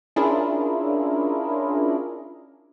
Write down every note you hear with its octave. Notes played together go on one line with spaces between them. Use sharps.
C#4 D4 E4 F4 G#4 A#4